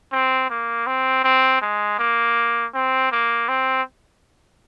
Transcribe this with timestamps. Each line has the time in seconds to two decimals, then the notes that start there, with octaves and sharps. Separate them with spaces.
0.13 C4
0.50 A#3
0.87 C4
1.24 C4
1.61 G#3
1.99 A#3
2.74 C4
3.11 A#3
3.48 C4